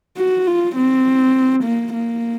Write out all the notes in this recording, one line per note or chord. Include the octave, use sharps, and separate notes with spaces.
F#4
F4
C4
A#3
A#3